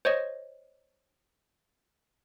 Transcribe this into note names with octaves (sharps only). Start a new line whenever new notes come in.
C5 C#5 D#5